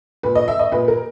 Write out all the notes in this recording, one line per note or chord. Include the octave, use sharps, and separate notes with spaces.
A#2 B4
D#5
E5
D#5
A#2 B4
A#4